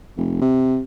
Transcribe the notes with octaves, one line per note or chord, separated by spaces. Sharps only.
F1
C3